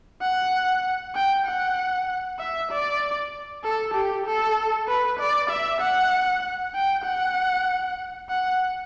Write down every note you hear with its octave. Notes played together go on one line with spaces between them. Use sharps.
F#5
G5
F#5
E5
D5
A4
G4
A4
B4
D5
E5
F#5
G5
F#5
F#5